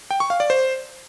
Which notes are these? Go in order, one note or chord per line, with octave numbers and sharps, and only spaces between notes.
G5
C#6
F5
D5
C5